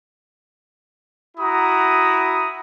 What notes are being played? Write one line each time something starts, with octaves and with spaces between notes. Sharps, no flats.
E4 F#4 A#5 D#6